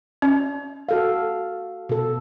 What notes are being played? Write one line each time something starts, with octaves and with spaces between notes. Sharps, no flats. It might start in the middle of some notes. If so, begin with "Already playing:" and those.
C#4
F#4 A4 F5
B2 A4